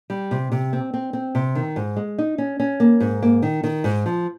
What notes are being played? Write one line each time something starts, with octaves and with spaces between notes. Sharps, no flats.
G3
C3
C3
C4
C4
C4
C3
D#3
G#2
G#3
D#4
C#4
C#4
A#3
G#2
A#3
D#3
D#3
G#2
F3